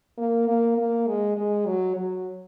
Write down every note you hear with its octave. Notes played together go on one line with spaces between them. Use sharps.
A#3
A#3
A#3
G#3
G#3
F#3
F#3